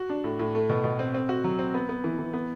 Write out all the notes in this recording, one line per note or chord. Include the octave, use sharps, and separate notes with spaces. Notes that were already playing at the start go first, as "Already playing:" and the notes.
Already playing: F#4
D4
A2
A2
A3
B2
B2
C4
C4
F#4
F#3
C4
B3
B3
E3
E3
B3